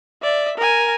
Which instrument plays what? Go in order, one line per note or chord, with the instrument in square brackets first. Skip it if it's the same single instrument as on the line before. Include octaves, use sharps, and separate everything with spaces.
[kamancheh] D5 E5
A#4 G#5